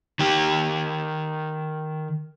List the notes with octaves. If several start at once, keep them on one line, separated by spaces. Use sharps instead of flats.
D#3 G4